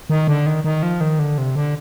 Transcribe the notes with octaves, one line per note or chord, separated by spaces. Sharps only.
D#3
D3
D#3
D#3
F3
D#3
D3
C3
D3